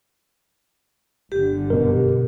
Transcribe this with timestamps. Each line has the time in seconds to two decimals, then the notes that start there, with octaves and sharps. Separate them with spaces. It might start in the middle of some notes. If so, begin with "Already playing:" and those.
1.32 G1 D3 G4
1.70 F#2 B2 A#4